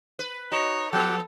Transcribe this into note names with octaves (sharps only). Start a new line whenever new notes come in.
B4
D#4 F#4 C#5 D#5
F3 B3 G4 A4 F#5 G5